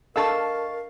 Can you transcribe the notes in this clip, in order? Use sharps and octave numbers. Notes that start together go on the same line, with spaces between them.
D4 A4 A#4 D#5 F5 A5 C#6 E6